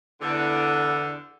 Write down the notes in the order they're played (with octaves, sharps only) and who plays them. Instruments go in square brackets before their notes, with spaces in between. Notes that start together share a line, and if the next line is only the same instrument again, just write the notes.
[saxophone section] E2 D3